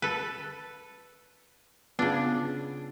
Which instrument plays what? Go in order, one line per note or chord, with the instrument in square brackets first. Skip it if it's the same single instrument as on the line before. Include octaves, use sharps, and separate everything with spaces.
[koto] A4 B4
[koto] C#3 D4 [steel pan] B3 F4